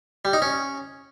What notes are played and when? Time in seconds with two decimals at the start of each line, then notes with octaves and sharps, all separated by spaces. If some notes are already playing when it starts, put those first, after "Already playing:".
0.25 G3
0.33 D#4
0.42 C#4